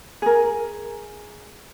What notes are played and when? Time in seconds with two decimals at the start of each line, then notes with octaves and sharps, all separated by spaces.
0.22 G#4 A#4